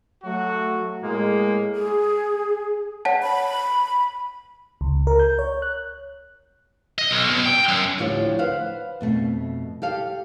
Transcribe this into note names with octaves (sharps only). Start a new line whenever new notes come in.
F#3 A3 F#4
A2 G#3 A#3
G#4
C#5 F#5 A5
B5
C#2
A#4
G6
C#5
F#6
D#5
B1
B2
G5
F#2
D2 A2 D3 F3 G4 C#5
B4 C5 F5 F#5
F2 B2 A3
G4 A4 F5